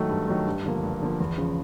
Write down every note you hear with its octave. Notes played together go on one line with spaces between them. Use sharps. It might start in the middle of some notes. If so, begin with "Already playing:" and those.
Already playing: D#3 F#3 A3
G2
D#3 F#3 A3
G2
D3 F3 A#3
G2
D3 F3 A#3
E2
C#3 F3